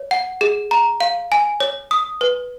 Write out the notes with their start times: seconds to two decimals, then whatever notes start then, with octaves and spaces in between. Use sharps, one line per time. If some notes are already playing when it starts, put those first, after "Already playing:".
Already playing: C#5
0.11 F#5
0.41 G#4
0.71 A#5
1.00 F5
1.32 G#5
1.60 C#5
1.91 D#6
2.21 B4